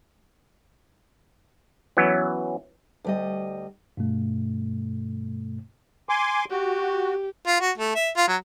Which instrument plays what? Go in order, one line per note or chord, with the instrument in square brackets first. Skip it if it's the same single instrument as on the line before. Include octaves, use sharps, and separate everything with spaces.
[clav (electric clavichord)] E3 F#3 B3 C#4
[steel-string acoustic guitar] D2 G3 D#5
[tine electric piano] G2 B2 A3
[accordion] G#5 C6 D6
[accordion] F#4 [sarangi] G4
[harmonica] F4
F#4
A3
E5
F4
F#3